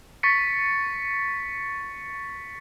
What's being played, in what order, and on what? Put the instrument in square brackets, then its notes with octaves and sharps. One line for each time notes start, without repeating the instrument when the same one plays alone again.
[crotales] C#6 A6 B6 C#7